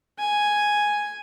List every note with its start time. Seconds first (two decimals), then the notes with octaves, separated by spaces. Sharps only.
0.19 G#5